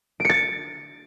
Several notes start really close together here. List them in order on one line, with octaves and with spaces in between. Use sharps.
D7 C#7 A6